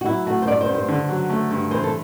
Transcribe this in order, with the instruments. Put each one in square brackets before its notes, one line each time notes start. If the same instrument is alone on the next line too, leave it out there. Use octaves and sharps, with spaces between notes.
[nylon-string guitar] F#4
[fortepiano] F#3 [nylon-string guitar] E4
[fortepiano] A3 [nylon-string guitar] F#4
[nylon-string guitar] C5
[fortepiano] G2 [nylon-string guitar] D5
[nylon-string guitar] C5
[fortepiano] G2
[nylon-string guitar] C5
[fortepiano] D3
F#3
A3
G2
[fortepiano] E3 [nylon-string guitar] C5
[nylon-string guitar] A4